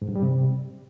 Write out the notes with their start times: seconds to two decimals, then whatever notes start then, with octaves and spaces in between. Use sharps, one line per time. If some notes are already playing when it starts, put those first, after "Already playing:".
0.02 G#2
0.09 G2
0.15 G3
0.22 C3